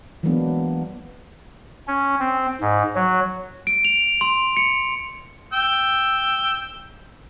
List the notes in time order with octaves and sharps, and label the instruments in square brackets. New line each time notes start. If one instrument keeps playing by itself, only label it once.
[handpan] E3 F#3 G#3 A#3 B3 D4
[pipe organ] C#4
C4
G#2
F#3
[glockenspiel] D7
F7
C6
C#7
[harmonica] G5 E6